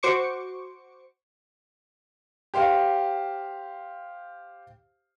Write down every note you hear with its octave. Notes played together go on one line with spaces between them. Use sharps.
F#4 C5 C#6 D6 C#7
G4 C5 F5